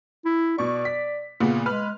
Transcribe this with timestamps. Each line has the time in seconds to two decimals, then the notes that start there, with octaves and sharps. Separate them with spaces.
0.25 E4
0.58 B2 D5 C#6
0.85 B6
1.40 A#2 C#3 B3
1.66 G#3 B4 F6